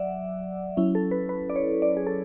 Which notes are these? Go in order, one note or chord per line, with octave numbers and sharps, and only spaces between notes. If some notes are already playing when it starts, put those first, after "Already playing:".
Already playing: F#3 D5 E5 F#5
F#3 C#4 E4
A4
B4
B4
D5
C#5
D5
G#4
A4